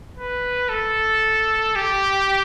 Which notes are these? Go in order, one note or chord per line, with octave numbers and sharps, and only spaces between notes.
B4
A4
G4